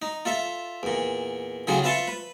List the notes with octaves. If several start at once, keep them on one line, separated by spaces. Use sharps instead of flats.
D#4
F4 A4 E5
E2 A#2
A2 C#3 F#3 F4 G#4
F4 B4 E5 A5 C6 C#6
B4